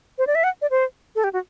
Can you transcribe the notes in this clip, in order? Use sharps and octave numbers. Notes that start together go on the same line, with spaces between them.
C5
D5
E5
F#5
D5
C5
A4
G4
F#4